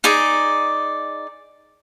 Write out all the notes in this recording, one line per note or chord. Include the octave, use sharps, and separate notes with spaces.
D#4 G#4 D5